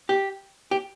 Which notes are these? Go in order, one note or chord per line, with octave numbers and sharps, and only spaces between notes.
G4
G4